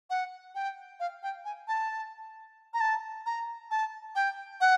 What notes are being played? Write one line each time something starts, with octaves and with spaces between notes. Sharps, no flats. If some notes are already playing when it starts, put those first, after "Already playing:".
F#5
G5
F5
G5
G#5
A5
A#5
A5
A#5
A5
G5
F#5